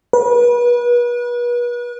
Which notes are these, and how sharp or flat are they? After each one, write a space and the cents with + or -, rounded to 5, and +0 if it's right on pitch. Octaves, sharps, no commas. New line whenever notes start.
B4 -35